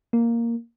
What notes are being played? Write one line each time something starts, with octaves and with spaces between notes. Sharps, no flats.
A#3